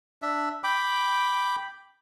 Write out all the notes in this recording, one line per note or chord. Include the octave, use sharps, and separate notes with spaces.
D4 E5
G5 B5 D6